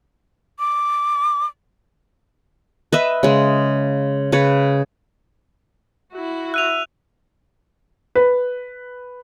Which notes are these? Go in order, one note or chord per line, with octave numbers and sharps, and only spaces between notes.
D6
B4 D#5 E5
C#3 G#3
C#3 B4 C#5
E4 F#4
E5 F#6 D#7 F7
B4